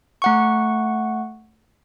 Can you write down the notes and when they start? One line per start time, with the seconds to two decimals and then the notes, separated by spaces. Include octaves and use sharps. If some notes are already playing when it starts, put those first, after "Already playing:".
0.22 A3 F#5 C#6